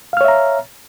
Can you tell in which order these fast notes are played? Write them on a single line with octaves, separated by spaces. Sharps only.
F5 F6 C#5 E5 A#5